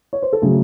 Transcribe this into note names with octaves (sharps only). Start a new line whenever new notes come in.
C#5
C5
A4
C#3 F#3 A3 G#4